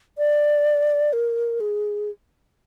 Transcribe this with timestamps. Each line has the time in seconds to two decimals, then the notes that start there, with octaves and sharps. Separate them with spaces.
0.18 D5
1.13 A#4
1.60 G#4